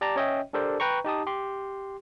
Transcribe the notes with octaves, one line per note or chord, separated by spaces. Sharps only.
G4 D5 A5 A#5
C#4 C#5 D#5 E5 G5
D4 G4 A4 A#4 C5 D5
B4 G5 A#5 C#6
D#4 G4 A5 D#6
G4 C6